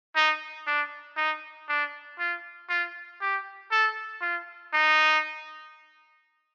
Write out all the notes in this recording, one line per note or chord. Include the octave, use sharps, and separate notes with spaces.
D#4
D4
D#4
D4
F4
F4
G4
A4
F4
D#4